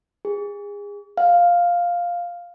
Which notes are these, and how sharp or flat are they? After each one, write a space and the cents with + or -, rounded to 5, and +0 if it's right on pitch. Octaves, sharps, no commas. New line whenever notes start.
G#4 -30
F5 +5